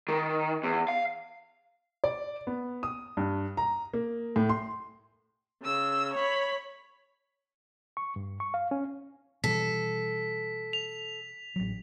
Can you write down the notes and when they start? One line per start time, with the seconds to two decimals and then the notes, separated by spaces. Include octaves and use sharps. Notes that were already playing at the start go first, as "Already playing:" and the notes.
0.09 D#3
0.63 E2
0.89 F5
2.04 D5
2.47 B3
2.83 D#6
3.17 G2
3.57 A#5
3.94 A#3
4.36 A2
4.49 C6
5.63 C#3 E6
6.15 C#5 B5
7.97 C#6
8.16 G2
8.40 C#6
8.54 F5
8.71 C#4
9.44 B2 E3 G3 A4 B6
10.73 F7
11.56 A1 F#3